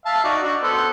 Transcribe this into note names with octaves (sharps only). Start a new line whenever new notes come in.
E5 F5 A5
D#4 F#4 D5
D4 F#4
B3 A4 C5